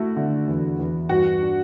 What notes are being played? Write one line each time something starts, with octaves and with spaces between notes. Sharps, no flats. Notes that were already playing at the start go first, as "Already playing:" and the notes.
Already playing: A3 E4 F#4
D3
E2
E2
G2 F#4
D4